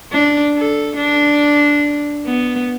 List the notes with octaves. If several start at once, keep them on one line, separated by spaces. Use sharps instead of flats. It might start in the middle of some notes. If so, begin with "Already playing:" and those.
D4
A4
D4
B3